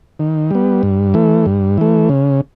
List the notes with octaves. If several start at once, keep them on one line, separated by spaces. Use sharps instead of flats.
D#3
G3 B3
G2
E3 A3
G2
E3 A3
C#3